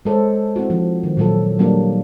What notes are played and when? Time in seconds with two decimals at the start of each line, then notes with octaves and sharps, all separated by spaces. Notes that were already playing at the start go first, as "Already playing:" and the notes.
0.05 G#3 A4 C5 C#5
0.56 C4 E4 F#4
0.70 F3
1.03 D#3
1.17 A#2 F#3 A4
1.59 F#3 G3 A#3 D4